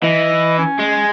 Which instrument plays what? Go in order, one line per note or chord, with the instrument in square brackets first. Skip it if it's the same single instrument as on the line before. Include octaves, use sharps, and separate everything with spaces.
[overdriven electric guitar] E3 [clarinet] D#5
[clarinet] C#4
[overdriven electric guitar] G#3